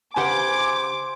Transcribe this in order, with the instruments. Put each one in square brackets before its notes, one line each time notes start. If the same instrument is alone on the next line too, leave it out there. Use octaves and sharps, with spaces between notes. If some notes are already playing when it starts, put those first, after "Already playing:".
[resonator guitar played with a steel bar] C#3 G4 F#5 [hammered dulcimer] C5 [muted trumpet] G#5 [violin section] D6